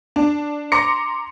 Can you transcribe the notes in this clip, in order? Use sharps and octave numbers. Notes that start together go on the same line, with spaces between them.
D4
A#5 C6 D6 A#6 C#7